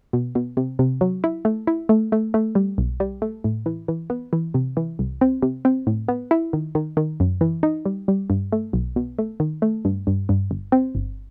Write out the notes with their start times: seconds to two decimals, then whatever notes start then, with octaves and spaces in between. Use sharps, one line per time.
0.13 B2
0.35 B2
0.57 C3
0.79 C3
1.01 F#3
1.24 E4
1.45 A3
1.67 E4
1.89 A3
2.12 A3
2.34 A3
2.55 G3
2.78 B1
3.00 G3
3.22 A3
3.44 A2
3.66 E3
3.88 E3
4.10 B3
4.33 E3
4.54 C3
4.77 E3
4.99 C2
5.21 C4
5.42 C3
5.65 C4
5.87 A2
6.08 B3
6.31 E4
6.53 D#3
6.75 D#3
6.97 D#3
7.20 F#2
7.41 E3
7.63 D#4
7.85 G3
8.08 G3
8.30 G2
8.52 A3
8.73 B1
8.96 B2
9.19 A3
9.40 D#3
9.62 A3
9.85 G2
10.07 G2
10.29 G2
10.51 G1
10.72 C4
10.95 G1